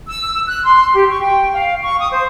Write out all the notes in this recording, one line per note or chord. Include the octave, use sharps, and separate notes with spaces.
E6
F#6
C6
G4
C#6
G5
F5
C#6
D#6
C5